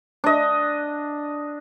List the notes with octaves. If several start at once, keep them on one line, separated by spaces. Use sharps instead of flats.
D4 D#5